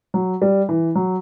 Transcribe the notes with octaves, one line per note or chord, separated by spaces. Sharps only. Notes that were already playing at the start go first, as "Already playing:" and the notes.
F#3
G3
E3
F#3